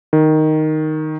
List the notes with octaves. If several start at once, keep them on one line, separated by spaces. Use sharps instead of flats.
D#3